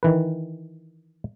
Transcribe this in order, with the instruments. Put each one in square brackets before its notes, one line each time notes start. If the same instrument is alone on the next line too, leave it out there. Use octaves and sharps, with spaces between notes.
[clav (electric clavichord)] D#3 E3 B4